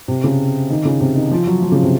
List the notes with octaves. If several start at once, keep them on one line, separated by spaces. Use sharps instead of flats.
C3
C#3
D#3
C#3
C3
D#3
F3
F#3
F3
C#3
C3